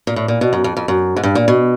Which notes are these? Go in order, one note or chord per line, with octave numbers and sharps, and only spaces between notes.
A#2
A2
A#2
B2
F#2
F2
F2
F#2
G#2
G2
A#2
B2